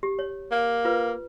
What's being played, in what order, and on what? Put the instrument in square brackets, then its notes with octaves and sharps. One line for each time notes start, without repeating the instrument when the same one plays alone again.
[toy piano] G4
C#5
[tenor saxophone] A#3
[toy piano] F4 B4